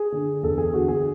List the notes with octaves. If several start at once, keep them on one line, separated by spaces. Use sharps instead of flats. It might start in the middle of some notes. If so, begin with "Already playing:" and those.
Already playing: G#4
D3
E2 A4
G#4
D3 F#4
G#4